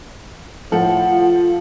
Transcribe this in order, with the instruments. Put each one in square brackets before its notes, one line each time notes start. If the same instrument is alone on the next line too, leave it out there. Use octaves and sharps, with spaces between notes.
[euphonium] A2 [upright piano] F3 A4 [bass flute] F#5
[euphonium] F4